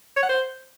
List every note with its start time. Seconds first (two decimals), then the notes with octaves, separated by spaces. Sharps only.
0.17 C#5
0.23 F#5
0.29 C5